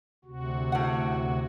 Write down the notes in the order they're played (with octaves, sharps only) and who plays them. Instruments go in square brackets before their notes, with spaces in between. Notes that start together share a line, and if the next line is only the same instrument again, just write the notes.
[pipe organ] D2 C3 F#4
[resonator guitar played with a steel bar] A2 F#5